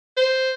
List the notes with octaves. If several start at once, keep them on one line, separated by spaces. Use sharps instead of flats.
C5